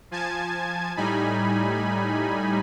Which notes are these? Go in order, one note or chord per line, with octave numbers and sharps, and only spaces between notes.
F3 G#5 A5 G#6
A2 G3 D#4 G#5 B5